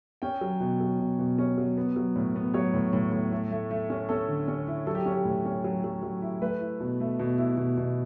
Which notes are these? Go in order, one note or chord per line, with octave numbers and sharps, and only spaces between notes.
C#4 G5
F#3
B2
F#3
B2
B2
C#4
F#3
B3
F#3
A2
B3
F#3 C#5
A2
A2
A2
A3
A3
A3
C#4
C#4 A4
D3
C#4
E4
F#3 A4
G4
C#4
G4
A2
C#4
F#3
F#3
F#3
E4
A3 B4
E4
B2
A3
B2
E4
B2
B2